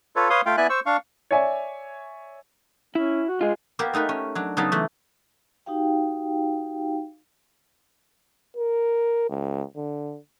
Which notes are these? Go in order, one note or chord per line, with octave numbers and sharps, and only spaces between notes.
F4 A4 B4 C#5
B4 C#5 F5 C6 D#6
A3 F4 F5 G5
B3 E4 D5 E5 G#5 F#6
C5 C#6 E6
D4 F5 C#6
C#5 D5 E5 G#5
C#4 E4
F#4
G#3 F4 G#4
A#3 B3 G4 A#4
A3 D#4 A#4 B4
C#4
F#3 D4
C#3 F#3 B3 D#4 D#5 A5
E3 A3
D#4 F#4 G4 F5 G5
A#4
C#2
D3